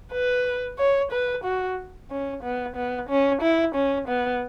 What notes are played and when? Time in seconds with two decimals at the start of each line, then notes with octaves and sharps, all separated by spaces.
0.12 B4
0.78 C#5
1.12 B4
1.44 F#4
2.10 C#4
2.43 B3
2.76 B3
3.09 C#4
3.42 E4
3.75 C#4
4.08 B3